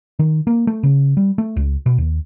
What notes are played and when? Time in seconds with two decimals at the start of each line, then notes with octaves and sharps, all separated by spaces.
0.19 D#3
0.47 A#3
0.67 A3
0.83 C#3
1.17 G3
1.38 A3
1.57 C#2
1.86 B2
1.98 D#2